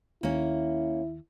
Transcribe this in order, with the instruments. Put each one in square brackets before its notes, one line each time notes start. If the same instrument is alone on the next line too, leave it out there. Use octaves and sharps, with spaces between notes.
[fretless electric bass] D#2 [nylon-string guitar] A#3 C#4 [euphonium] E4